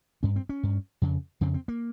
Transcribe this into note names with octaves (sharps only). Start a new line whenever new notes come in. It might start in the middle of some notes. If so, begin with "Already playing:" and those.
G2 C#4
C4
C#4
G2
F2 C#3
F2 C#3 C4
C4
A#3